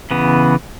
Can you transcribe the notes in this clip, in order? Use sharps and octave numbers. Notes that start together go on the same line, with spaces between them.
C#3 E3 B3